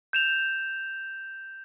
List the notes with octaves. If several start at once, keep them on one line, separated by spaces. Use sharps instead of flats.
G6 E7 F7